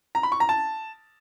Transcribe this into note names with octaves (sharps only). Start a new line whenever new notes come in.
A#5
B5
C#6
A#5
A5